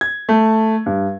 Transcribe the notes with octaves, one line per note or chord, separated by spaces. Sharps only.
G#6
A3
G2